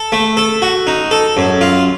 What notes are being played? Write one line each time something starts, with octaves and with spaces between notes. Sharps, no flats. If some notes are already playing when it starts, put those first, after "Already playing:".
Already playing: A4
A3
A4
F#4
D#4
A4
F#2
F4